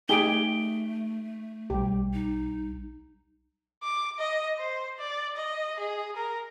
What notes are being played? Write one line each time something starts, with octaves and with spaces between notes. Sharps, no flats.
A3 D#4 G4 G#4 D7 G7
B1 G3 G4
D#4
D6
D#5
C5
D5
D#5
G#4
A#4